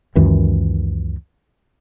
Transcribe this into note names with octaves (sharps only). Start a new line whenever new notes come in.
C#2 F#2 D#3 E3